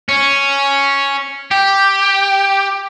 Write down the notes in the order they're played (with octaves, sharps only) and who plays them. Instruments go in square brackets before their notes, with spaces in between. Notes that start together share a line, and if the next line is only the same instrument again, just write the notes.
[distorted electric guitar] C#4
G4